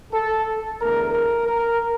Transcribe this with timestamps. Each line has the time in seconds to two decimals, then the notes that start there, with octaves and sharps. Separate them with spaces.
0.13 A4
0.80 E2 D3 A3 A#4
1.13 A#4
1.47 A#4